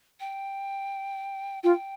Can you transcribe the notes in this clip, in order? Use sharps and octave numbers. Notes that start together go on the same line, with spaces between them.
G5
F4 G5